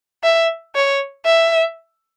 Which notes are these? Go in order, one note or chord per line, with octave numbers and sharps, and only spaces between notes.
E5
C#5
E5